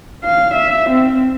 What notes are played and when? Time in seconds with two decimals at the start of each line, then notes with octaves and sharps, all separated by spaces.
0.25 F5
0.55 E5
0.90 C4